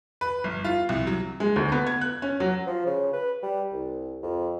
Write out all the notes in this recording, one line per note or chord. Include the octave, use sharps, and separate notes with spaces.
B4
G1
F4
C2
F#3
G#3
D2
B3
G#6
F#6
C#4
F#3
F3
C#3
B4
G3
C2
F2